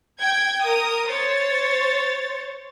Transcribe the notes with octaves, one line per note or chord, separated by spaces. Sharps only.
G5 G#6
A#4 D#6
C5 C#5 A6